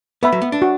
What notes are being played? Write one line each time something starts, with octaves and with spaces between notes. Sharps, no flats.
B3 B4 E5 B5
F#3
B3
D4
F#4